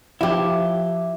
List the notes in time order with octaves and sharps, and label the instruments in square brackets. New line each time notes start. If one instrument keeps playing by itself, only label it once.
[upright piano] F3 [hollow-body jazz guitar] E4 G4